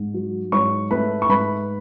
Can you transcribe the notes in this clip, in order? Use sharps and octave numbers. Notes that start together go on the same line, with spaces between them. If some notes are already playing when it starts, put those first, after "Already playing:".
Already playing: G#2
F#3
G#2 C#5 C#6
A3 B4 B5
C#6
G#2 B4 B5